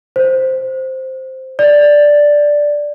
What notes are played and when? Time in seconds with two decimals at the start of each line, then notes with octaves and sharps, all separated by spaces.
0.16 C5
1.59 D5